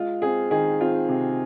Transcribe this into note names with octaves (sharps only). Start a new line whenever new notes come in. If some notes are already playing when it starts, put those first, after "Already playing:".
Already playing: G#3 F4
C4 G#4
D#3 G#4
C4 F4
C3